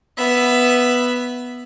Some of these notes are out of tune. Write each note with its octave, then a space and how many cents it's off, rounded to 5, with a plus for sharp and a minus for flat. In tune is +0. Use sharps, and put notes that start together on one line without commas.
B3 +0 E5 +10